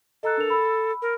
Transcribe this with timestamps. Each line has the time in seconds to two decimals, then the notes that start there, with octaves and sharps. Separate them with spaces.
0.23 A4 D#5 A#5 F#6
0.37 D4 A#4 F7
0.50 B5 E6
1.02 A#4